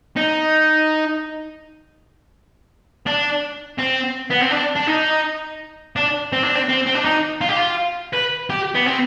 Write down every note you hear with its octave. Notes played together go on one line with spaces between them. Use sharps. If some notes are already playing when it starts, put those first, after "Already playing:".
D#4
D4
C4
B3
C4
D4
D4
D#4
D4
C4
D4
C4
C4
C4
D4
D#4
F4
G4
F4
B4
G4
B3
C4